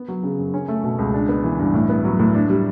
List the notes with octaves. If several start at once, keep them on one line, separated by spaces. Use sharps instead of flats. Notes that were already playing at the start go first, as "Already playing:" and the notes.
Already playing: B3
F#3
C#3
F#2
C#4
A3
B2
C#2
D4
B3
E3
G2
A2
B3
F#3
A2
D4
G3